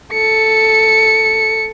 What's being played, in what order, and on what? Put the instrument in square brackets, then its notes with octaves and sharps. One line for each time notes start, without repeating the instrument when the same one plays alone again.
[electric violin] A4 C#7